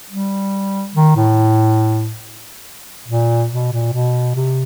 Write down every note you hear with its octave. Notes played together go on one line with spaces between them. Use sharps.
G3
D#3
A2
A#2
B2
A#2
B2
C3